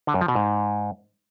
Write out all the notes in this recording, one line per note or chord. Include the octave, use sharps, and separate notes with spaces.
D3
F#2
F3
B2
G#2